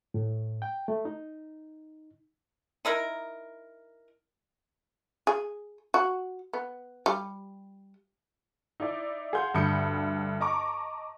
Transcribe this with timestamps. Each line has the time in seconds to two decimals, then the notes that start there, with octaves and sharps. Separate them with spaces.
0.14 A2
0.62 G5
0.88 A3
1.05 D#4
2.85 D#4 E4 A#4
5.27 G#4
5.94 F#4
6.53 B3
7.06 G3
8.80 D#4 E4 D5
9.33 G#4 F5 F#5 C6 G6
9.54 D2 G2 B5 D#6 G6 C#7
10.41 D#5 A5 A#5 C#6 D6